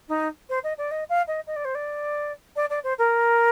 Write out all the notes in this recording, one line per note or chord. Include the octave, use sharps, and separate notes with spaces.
D#4
C5
D#5
D5
D#5
F5
D#5
D#5
D5
C5
D5
D5
D5
C5
A#4